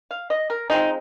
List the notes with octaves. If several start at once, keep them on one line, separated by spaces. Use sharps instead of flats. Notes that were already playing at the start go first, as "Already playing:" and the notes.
F5
D#5
A#4
F3 G#3 C4 D#4